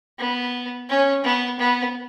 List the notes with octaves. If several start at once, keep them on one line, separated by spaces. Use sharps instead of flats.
B3
C#4
B3
B3